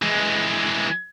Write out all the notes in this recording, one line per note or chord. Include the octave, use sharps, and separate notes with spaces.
E3 G#3